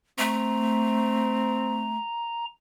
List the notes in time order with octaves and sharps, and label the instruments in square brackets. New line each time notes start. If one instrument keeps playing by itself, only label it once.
[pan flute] A3 [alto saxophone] C4 [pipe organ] A#5